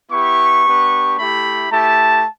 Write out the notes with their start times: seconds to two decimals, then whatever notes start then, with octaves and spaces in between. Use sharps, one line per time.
0.11 B3 E4 G4 C#6
0.65 B3 D4 G4
1.19 A3 E4 G4 B5
1.71 A3 E4 G4 A5